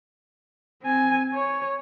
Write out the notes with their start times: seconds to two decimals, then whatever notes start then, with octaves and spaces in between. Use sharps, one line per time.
0.82 C4 G#5
1.34 C#5